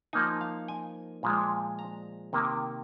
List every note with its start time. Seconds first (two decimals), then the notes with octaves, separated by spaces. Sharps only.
0.13 F3 A#3 D#4 G#5
0.41 F5
0.68 G#5
1.23 A#2 F3 G#3
1.79 A#5
2.33 C3 D#3 A#3